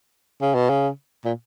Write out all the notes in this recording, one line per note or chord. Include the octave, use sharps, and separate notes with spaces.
C#3
B2
C#3
A#2